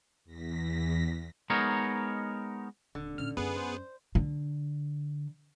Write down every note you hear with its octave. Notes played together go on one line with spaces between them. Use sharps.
E2 A#6 B6
G#3 B3 D#4 A#4 C#5
D#1 D3
A#2 C#4 F6
F#2 F#3 B3 G#4 B4
C5
D3